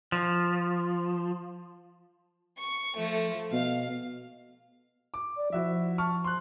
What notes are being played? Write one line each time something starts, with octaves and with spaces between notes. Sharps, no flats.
F3
C#6
F3 A3
B2 F5
D6
D5
F3 E4 F#4 E5
A5 C#6 F6
C6 F#6